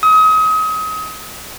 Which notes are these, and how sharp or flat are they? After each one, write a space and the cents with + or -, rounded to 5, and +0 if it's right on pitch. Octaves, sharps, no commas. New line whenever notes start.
D#6 +30